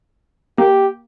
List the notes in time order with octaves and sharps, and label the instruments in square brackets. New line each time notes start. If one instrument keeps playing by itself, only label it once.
[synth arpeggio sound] A#3 [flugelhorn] G4